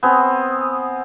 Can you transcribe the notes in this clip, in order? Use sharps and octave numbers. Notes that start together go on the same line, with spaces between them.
B3 C4 G#4